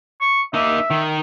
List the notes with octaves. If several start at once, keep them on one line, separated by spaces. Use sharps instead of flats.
C#6
A#3 D#4 E5
D#3